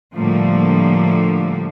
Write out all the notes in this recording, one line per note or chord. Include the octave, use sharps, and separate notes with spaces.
A2 D3 F3 G3 A3 A#3